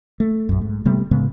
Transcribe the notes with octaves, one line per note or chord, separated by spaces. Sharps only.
A3
A#1 F#2
G#2
C3 G3 A3 B3
A2 C#3 G#3 B3